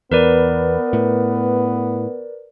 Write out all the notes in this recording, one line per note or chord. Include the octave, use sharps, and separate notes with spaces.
E2 B3 A#4 B4 D5
A2